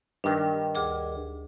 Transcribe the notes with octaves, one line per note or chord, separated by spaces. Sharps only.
G2 D#3 D4 G5
D2 G#4 D6